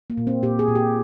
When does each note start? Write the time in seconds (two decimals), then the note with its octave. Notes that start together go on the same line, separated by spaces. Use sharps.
0.10 A#3
0.17 A#2
0.27 C4
0.43 A#2 G4
0.59 G#4
0.68 A#2
0.75 G4